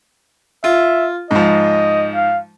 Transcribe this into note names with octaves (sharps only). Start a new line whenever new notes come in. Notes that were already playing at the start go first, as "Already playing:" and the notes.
F4 E5
G#2 F3 D#5
F5